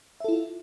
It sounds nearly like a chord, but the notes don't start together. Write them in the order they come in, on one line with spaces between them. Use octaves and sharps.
E5 A4 E4 F4